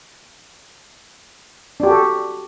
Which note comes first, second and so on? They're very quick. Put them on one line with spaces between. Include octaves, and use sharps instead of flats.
D4 G4 F#4 A4